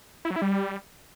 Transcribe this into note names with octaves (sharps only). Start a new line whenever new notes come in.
E4
F#3
E4
G3